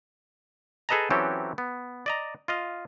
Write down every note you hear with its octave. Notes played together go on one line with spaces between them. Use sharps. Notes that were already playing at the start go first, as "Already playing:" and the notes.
G#4 A4 B4 D#5 A5 A#5
E3 F#3 C4 C#4 G4 A4
B3
D5 D#5 A#5
F4 D#5 F5